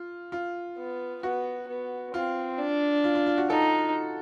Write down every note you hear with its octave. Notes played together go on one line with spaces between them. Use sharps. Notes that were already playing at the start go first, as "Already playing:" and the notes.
Already playing: F4
F4
B3
B3 F#4
B3
C4 F4
D4
F4
F4
F4
F#4
D#4 A4